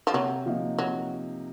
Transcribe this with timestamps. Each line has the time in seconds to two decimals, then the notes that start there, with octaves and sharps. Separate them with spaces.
0.07 F3
0.13 C3 F#3
0.46 F3 A#3 D#4
0.78 C3 F#3